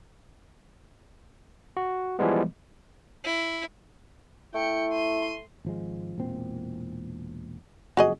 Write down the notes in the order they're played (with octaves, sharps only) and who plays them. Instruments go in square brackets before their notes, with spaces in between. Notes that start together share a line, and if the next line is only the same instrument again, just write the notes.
[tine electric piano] F#4
E3 F3 G3 G#3 B3
[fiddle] E4
[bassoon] A3 [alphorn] E4 [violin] G5 C#7
[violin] C6 D#7
[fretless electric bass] G#1 F3 G#3
E1 A#2 C4
[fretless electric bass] F#1 F2 [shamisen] F#4 G#4 D#5